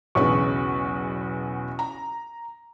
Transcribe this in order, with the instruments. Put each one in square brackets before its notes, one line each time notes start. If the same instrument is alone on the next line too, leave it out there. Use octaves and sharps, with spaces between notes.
[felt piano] B1 E2 B4 [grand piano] C#3 C#6
[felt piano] A#5